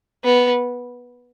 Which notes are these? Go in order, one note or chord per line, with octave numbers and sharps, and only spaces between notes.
B3